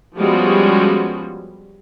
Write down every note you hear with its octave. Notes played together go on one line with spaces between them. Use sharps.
F3 G3 G#3 B3 C#4 F#4